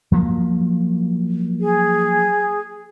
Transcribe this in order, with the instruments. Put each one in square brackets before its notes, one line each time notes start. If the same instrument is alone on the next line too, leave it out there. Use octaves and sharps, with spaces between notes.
[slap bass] F3 F#3 A#3
[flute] G#4